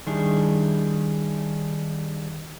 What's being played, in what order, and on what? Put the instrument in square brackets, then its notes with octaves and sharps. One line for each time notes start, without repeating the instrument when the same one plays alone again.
[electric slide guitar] D#3 G3 D4 E4 G#4